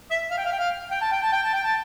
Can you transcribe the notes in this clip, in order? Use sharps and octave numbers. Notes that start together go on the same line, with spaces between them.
E5
F5
G5
F5
G5
F5
G5
A5
G5
A5
G5
A5
G5
A5